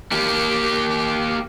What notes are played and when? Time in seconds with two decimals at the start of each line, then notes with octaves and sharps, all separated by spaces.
0.12 A#3 G4